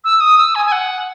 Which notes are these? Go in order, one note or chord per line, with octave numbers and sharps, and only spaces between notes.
E6
D#6
E6
G#5
G#5
F#5